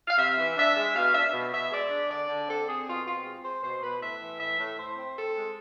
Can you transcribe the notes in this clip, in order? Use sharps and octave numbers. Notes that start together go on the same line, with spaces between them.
F5
C3 E5
E3
D4 E5
G#3
B2 F5
D4 E5
B2
B2 E5
G#3 D5
D4
D3 D5
D3
C4 A4
C4 G#4
B2 F4
C4 F4
G#3
G#3 C5
B2 C5
B2 B4
A2 E5
E3
A2 E5
A2
A2 C5
C4
C4 A4
G#3